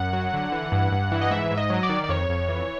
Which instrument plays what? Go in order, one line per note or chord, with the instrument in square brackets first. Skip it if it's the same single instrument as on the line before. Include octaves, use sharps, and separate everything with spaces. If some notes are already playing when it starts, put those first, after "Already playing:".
Already playing: [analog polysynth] F#2 F#5
F#3
D3
E3
G2
G2
E3
D#5
G#2 E5
G#2
D#5
F#3
D5
D#3
D5
F2 C#5
F2
E3